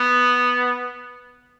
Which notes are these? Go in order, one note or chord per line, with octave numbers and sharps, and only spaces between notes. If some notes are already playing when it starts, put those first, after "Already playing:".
Already playing: B3